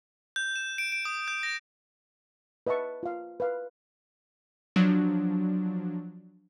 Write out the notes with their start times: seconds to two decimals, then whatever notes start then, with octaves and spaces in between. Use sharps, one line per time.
0.36 G6
0.56 E7
0.78 D7
0.92 D7
1.05 D#6
1.28 G6
1.43 A#6
2.67 B4 D#5 E5 A5 C#6
3.03 F4 F5
3.40 B4 F5
4.76 F3 F#3 D4